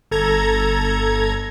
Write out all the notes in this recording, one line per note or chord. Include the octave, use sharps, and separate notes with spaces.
G1 A4 A#5 G#6